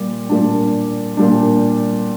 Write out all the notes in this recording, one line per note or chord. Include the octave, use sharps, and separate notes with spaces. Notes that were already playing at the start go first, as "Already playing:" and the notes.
Already playing: A#2 G3
A#2 G3 D4
A#2 G3 D4